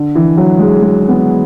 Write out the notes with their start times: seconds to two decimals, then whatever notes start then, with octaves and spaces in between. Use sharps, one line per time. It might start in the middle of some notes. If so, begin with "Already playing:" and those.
Already playing: D3
0.15 E3
0.37 F#3
0.59 G#3
0.81 G#3
1.09 B3